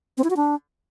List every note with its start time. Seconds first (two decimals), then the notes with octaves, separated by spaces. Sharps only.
0.18 C4
0.24 E4
0.30 F#4
0.36 D4